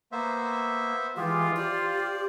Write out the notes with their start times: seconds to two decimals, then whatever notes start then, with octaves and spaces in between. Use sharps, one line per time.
0.12 A#3 B3 C5 E5
1.17 E3 G#3 F4 G4 G#4
1.57 G4 C5 D5